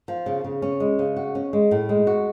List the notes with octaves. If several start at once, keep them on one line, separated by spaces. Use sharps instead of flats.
F3
C#3
C#3
C#4
G#3
C#3
F#4
C#4
G#3
A2
G#3
F#4